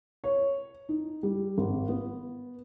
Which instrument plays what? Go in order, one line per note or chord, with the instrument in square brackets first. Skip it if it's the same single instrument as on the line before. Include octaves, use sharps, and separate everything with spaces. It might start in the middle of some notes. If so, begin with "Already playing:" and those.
[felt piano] C#5
D#4
G3
G#1
B3